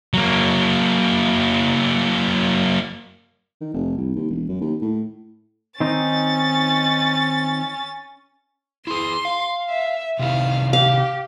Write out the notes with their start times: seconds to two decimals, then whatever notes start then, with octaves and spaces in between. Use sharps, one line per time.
0.14 F#3 A#3
3.61 D#3
3.74 F1
3.97 C2
4.16 D#2
4.30 E1
4.49 F#2
4.61 D#2
4.81 A2
5.80 D#3 C4 C#4 D#4 A6
8.87 E4 G#4 C6
9.25 F5
9.70 E5
10.19 C3 D#3 E4 F5
10.73 G4 F5